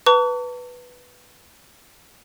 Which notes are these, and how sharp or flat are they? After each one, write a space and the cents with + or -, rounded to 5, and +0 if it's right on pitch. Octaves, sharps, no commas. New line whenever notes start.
B4 +0 A5 +45 C#6 +45